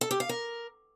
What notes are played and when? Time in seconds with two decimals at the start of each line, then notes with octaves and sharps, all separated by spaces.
0.01 A4
0.11 G4
0.20 F5
0.29 A#4